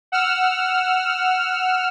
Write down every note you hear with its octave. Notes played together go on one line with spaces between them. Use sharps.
F#5 E6 F6